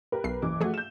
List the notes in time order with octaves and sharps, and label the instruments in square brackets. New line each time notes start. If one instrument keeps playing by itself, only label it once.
[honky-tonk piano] G4 A#4 B4
[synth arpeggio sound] B1 C7
[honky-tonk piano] F#1 E3 D6
[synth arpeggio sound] F3 G#4 [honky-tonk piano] A3 F#4
[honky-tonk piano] G6 E7